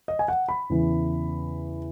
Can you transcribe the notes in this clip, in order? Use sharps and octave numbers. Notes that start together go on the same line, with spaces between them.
D#5
G#5
F#5
B5
E2 C#3 E3